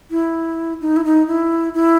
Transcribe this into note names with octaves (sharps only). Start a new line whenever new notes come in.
E4
D#4
E4
D#4
E4
E4